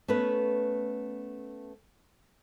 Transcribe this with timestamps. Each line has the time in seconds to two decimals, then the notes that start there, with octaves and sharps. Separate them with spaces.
0.08 A3 B3 C#4 B4